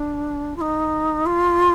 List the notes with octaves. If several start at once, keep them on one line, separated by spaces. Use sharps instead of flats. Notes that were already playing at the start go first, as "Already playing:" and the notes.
Already playing: D4
F4
D#4
F4